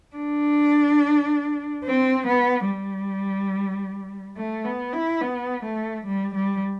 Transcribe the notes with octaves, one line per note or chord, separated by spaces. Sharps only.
D4
C4
B3
G3
A3
B3
E4
B3
A3
G3
G3